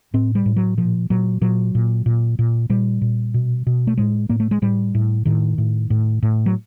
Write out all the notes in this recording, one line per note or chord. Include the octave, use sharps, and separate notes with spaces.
A2 C4
G3
A2
F#3
A#2 F3
A#2 F#3
A#2 F#3
A#2
A#2
A#2
A#2 G3
A#2
B2
B2
A3
A2 G#3
A2 A#3
A3
G#3
A2 G3
A2
A2 D#3
A2
A2
A2
F#3